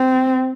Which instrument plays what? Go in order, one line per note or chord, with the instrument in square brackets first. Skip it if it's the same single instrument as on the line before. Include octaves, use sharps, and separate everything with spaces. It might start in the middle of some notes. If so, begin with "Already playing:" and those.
Already playing: [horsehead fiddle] C4